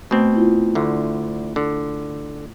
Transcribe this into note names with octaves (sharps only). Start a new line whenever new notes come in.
B2 A3 C4
E4 F4
D2 D3
D3